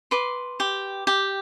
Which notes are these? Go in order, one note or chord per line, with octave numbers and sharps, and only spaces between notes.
B4 C6 D6
G4
G4